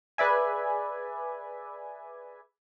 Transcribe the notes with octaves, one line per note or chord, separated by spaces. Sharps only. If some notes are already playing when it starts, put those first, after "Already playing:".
G#4 B4 D5 E5 G#5